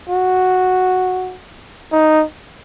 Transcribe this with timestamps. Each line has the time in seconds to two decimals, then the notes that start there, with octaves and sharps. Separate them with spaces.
0.09 F#4
1.92 D#4